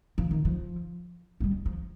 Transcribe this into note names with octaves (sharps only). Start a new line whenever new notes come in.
F3
D#3
F3
A3
G3
F3